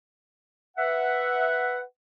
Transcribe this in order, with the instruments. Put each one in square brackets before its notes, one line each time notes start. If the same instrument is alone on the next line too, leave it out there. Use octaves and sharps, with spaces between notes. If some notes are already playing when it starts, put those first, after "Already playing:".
[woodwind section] B4 E5 F#5